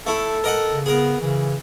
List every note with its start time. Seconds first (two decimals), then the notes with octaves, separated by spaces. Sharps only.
0.07 A3 E4 A4
0.44 A#4 D#5 F#5
0.70 C#3
0.86 B3 G#4 A#4
1.21 C#3 E3